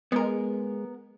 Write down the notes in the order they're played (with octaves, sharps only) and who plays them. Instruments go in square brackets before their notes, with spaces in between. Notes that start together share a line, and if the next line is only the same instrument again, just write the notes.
[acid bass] G#3 [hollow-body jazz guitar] B3 A#4